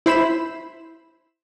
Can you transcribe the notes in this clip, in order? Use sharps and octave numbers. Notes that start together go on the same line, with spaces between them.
E4 C5 B5 E7